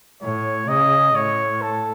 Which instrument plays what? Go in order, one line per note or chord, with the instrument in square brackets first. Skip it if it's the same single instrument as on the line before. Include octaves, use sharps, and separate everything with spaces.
[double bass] A2 [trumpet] C#5
[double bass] C#3 [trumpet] D#5
[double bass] A2 [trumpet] C#5
[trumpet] A4